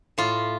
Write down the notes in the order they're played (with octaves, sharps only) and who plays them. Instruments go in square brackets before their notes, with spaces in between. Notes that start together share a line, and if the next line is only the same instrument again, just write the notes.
[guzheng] A2 F4